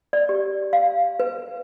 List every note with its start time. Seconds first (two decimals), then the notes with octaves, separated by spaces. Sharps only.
0.13 D5
0.29 G4
0.73 F5
1.20 B4